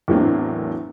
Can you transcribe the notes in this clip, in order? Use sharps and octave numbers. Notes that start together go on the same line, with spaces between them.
E2 A2 F#3 A#3 C4 D4